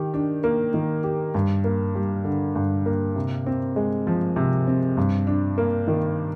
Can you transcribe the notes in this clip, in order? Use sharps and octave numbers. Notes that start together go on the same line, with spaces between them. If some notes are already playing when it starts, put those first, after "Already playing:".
Already playing: D#3 G4
D4
A#3
D#3
G4
G2
A#3
G3
D3
G2
A#3
C3
C4
G#3
F3
C3
C4
G2
D4
A#3
D#3